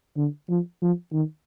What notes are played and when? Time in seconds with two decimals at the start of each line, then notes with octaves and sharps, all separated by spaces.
0.17 D3
0.49 F3
0.82 F3
1.13 D#3